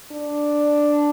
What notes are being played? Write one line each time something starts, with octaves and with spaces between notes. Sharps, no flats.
D4